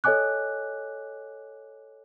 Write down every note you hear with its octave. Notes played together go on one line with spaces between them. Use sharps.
A4 C#5 D#5 G#5 D6 F#6